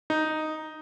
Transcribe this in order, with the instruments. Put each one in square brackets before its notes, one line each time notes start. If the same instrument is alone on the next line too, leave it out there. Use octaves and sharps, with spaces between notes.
[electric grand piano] D#4